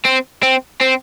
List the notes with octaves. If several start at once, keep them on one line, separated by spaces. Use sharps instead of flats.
C4
C4
C4